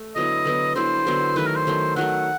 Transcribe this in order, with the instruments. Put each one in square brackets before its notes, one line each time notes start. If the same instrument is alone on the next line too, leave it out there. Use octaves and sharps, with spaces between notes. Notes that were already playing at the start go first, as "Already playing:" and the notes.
Already playing: [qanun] A3
[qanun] D3 F#3 B3 E4 [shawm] D#5
[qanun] D3 F#3 B3 E4
[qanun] D3 F#3 B3 E4 [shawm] C5
[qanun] D3 F#3 B3 E4
[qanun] D#3 F#3 A3 [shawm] B4
[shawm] A#4
C5
[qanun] D#3 F#3 A3
[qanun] D#3 F#3 A3 [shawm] F#5